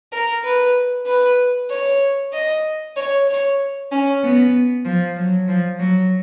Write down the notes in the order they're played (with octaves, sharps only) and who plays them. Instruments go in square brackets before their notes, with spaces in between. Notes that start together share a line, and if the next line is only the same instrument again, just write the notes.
[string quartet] A#4
B4
B4
C#5
D#5
C#5
C#5
C#4
B3
F3
F#3
F3
F#3